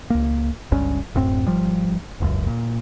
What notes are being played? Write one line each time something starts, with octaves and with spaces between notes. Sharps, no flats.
C#2 A#3
G1 C#2 G2 C#4
D1 F#2 A2 C4
G#1 F3 G3
E1 C#2 F#2
A#2